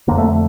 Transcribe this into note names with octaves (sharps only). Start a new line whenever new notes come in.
F2 D3 A#3
A3
A3